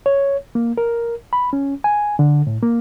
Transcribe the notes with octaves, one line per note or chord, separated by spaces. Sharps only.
C#5
A#3
A#4
B5
C#4
G#5
D3
A2
A#3